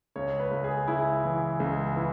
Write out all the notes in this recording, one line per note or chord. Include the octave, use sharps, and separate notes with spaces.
C#2 C#5
B4
C#2
G#4
C#2 E4
E3
C#2
E3